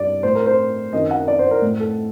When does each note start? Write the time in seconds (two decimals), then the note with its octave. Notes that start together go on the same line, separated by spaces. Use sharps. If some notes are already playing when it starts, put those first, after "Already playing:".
Already playing: G2 D5
0.23 A2 C5
0.35 A#4
0.46 C5
0.93 F#2 D#3 D#5
1.11 F#5
1.28 D5
1.39 C5
1.51 A#4
1.62 A2
1.80 A4